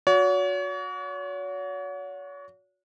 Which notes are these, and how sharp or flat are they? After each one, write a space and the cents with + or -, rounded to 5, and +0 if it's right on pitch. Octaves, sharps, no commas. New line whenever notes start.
F#4 -25 C#5 +40